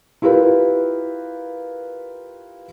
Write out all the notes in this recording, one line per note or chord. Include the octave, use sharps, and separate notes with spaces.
E4 F4 G4 A#4 B4